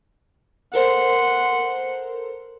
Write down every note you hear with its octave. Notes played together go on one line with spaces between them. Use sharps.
A4 A#4 C5 F#5 C6